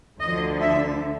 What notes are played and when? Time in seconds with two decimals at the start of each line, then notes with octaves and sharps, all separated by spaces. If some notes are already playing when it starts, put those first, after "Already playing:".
0.19 D2 D3 F3 D#5
0.59 E5